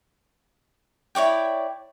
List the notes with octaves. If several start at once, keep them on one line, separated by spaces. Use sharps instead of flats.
E4 C#5 D5 G5